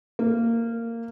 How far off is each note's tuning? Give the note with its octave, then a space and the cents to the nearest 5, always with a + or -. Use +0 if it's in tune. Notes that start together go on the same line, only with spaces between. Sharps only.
A#3 -15